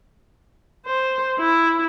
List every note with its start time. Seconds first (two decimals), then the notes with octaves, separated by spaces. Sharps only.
0.86 C5
1.39 E4